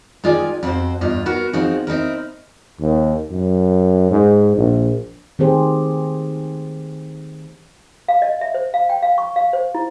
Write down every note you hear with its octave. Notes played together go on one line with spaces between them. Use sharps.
D#3 G#3 F4 G#4 D5 G#5
F2 C4 F4 F#4 C5
E2 G2 F4 D#5
B3 F#4 A#4
F3 C4 D#4 F#4 G#4
C4 D#4 E4 A#4
D#2
F#2
G#2
A#1
D#3 A3 C4 G4 G#4 C5
F5
D#5
E5
C5
F5
G5
F5
C#6
F5
C5
E4